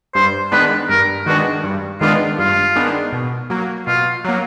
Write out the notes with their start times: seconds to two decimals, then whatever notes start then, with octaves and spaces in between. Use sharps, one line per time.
0.15 G2 C5
0.52 D#3 G#3 B3 D4 B4
0.89 G2 A#4
1.26 D#3 G#3 B3 D4 F#4
1.64 G2
2.01 D#3 G#3 B3 D4 F4
2.38 G2 F4
2.76 D#3 G#3 B3 D4
3.13 B2
3.50 F#3 A#3
3.87 B2 F4
4.25 F#3 A#3